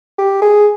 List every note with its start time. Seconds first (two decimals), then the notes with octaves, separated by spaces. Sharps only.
0.19 G4
0.42 G#4